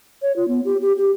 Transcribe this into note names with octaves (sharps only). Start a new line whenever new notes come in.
C#5
F4
B3
G4
G4
G4